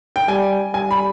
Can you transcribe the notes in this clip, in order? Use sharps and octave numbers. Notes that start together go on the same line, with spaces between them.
G5
G3 G#5
G3 G#5
B5